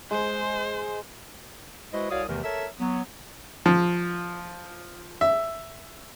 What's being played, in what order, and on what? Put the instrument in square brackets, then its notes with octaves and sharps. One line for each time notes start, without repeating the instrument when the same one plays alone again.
[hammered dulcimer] G#3 [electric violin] C5
[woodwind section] G#3 E4 F#4 B4 C5 D#5
C2 F#4 C#5 D5 F5 D#6
E2 C3 D#3 E3 A3 A#4
A4 A#4 C#5 E5
F#3 B3
[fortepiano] F3
E5